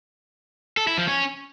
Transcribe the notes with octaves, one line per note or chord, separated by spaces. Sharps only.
A4
E4
F3
C#4